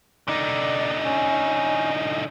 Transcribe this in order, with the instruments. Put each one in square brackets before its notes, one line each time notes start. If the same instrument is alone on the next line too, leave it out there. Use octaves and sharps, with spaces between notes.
[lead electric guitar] D3 D#4 [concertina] D5
[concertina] C#4